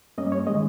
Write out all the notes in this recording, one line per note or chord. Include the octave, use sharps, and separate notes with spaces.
G2 G3 A#3 C#4 D#5
C#5
D#3 G#3 D#5